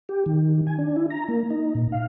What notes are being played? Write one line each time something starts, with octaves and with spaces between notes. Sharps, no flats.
G4
D#3
G#5
D4
E4
A#5
A#3
D#4
A#2
F5